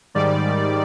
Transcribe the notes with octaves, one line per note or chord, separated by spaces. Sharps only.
G#2 D#3 G3 D5